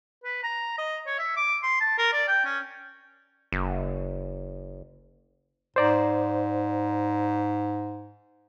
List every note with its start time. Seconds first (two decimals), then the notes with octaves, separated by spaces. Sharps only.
0.24 B4
0.43 A#5
0.78 D#5
1.07 C#5
1.19 E5
1.37 D6
1.63 C6
1.81 A5
1.98 A#4
2.13 D5
2.28 G5
2.45 C#4
3.52 F#1
5.76 G#2 C5 D5 A#5